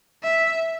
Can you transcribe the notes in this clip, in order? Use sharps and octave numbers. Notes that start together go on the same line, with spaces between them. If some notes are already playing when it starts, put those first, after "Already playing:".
E5